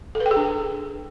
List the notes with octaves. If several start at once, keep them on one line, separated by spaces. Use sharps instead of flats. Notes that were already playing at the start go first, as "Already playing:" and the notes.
A4
B4
G5
G#4
D4